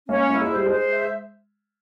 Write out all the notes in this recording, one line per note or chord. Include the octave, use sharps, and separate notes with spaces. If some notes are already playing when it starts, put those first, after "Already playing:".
A#3 C#4
A#3 E4
G#3
G3 C5
G#3 C5
E5